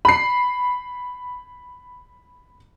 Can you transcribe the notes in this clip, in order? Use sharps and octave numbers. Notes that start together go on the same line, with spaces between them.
B5 C7